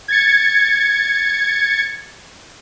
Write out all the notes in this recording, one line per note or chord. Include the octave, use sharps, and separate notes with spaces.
G#6 A6 C#7